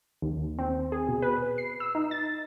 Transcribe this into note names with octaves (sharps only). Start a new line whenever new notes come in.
D#2
C4
G#4
B2
B4
C7
E6
D#4
A6